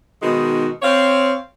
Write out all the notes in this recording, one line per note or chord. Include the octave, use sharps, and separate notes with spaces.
B2 D#3 G#3 B3 D#4 F#4
C4 C#5 F5